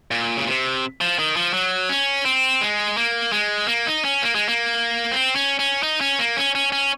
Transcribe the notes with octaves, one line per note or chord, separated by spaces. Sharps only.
A#2
C#3
C3
F3
D#3
F3
F#3
C#4
C4
G#3
A#3
G#3
A#3
D#4
C#4
A#3
G#3
A#3
C4
C#4
C#4
D#4
C#4
A#3
C#4
C#4
C#4